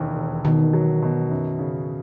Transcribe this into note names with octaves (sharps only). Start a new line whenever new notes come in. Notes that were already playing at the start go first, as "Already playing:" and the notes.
Already playing: E1 D#2 E3
E1
B2 D#3
F#3
B2
F#2
C#3